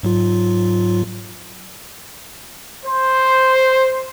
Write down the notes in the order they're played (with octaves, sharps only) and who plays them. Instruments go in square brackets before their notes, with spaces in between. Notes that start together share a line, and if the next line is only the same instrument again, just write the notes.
[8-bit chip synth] G#2 F#3 F4
[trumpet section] C5